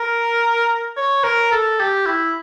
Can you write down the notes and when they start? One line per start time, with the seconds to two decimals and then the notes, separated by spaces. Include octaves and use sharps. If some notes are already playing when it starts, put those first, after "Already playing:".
Already playing: A#4
0.97 C#5
1.24 A#4
1.52 A4
1.80 G4
2.06 E4